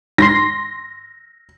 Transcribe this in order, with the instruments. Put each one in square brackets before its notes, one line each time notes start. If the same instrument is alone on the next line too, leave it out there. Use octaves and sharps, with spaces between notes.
[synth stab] G#2 C6 [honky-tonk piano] A#6